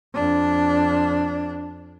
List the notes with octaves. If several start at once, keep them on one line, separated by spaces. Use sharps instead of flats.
F2 D4